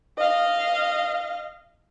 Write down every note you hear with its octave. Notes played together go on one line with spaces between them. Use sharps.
D#5 F5